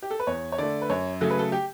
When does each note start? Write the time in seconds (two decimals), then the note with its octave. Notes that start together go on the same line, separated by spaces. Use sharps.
0.02 G4
0.11 A4
0.20 B4
0.27 E2 C#5
0.52 C#5
0.58 D3 A3 D5
0.82 B4
0.90 F#2 C#5
1.21 C#3 F#3 A3 A4
1.31 B4
1.39 A4
1.52 G4